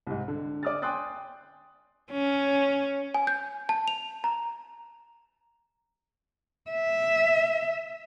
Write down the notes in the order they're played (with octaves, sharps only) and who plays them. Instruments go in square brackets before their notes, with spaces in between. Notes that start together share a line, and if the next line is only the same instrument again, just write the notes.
[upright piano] C2 G#2
D3
D5 D6 D#6 F6 A6
G5 G#5 C6 D#6 F#6 A6
[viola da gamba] C#4
[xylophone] G#5
G6
A5
F7
A#5
[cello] E5